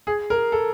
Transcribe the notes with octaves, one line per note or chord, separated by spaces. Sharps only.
G#4
A#4
A4